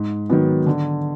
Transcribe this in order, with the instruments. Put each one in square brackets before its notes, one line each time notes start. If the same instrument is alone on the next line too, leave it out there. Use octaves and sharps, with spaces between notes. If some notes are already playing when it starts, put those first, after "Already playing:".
Already playing: [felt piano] G#2
D#3 F#3 B3
D3